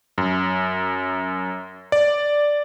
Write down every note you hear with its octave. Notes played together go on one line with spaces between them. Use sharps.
F#2
D5